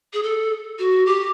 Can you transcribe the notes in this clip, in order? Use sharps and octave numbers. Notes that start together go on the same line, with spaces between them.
G#4
A4
F#4
G4